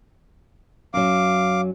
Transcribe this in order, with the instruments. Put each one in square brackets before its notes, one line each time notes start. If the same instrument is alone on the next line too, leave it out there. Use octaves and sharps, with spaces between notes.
[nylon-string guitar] F#2 F#3 [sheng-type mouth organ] F5 D6